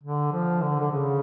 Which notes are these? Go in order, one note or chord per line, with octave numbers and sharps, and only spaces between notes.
D3
F3
D3
D3
C#3